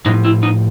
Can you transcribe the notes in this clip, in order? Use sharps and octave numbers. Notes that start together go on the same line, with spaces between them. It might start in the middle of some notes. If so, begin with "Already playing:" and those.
A2 F3 D#4
E4
D#4